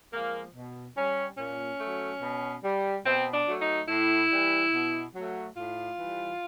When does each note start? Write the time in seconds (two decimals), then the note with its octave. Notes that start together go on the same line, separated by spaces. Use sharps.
0.13 F3 G#3 A#3
0.55 B2
0.97 G3 C#4
1.38 A#2 C#4
1.80 F#3 A3
2.22 B2
2.64 G3
3.06 B2 C4
3.34 D4
3.47 F#3 A3
3.62 D#4
3.89 A2 E4
4.31 E3 G3
4.73 B2
5.15 F#3 A3
5.56 A2 F4
5.99 E3 G3